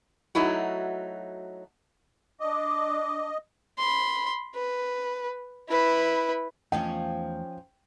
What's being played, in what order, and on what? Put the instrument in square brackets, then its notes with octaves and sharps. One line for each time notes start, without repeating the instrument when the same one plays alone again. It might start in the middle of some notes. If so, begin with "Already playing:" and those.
[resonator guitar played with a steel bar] F#3 A3 D#4 E4 F#4
[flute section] D4 D6 [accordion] D#5
[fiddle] B5 C6
B4
E4 B4
[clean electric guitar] E2 A3 A5 [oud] F3 C#4 D#4 [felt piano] G5